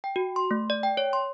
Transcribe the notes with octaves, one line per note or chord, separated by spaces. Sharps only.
G5
F#4
C6
A3
D5
G5
C#5
C6